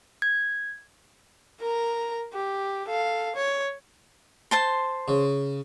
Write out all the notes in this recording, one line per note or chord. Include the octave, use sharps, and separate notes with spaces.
G#6
A#4 A#5
G4
A4 F5
C#5
C5 A5 C6
C#3